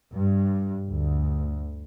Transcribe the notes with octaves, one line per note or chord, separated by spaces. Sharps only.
G2
D2